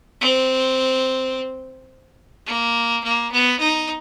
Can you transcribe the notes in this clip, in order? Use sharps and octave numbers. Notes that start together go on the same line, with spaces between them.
C4
A#3
A#3
B3
D#4